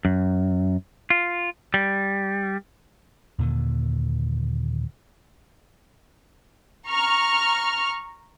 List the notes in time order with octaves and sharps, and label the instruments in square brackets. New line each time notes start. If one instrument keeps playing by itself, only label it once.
[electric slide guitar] F#2
F4
G3
[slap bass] D#2 A#2 D3 D#3
[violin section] A#5 C#6 F6